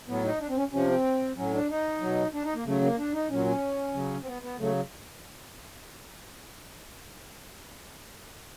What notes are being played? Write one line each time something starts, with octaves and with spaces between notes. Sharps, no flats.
A2 F#3 B3
D#4
D4
C4
C#4
C3 F3 C#4
C4
A2 F#3 C#4
D4
D#4
B2 F#3
D4
D#4
A#3
C#3 F#3 A3
A#3
D4
D#4
A#2 F#3 C#4
C#4
C#3 F#3
C4
B3
B3
C#3 F#3 A3